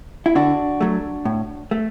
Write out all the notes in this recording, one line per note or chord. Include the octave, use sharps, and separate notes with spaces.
E4
D3 D4 F#4
F#3 A3
A2
A3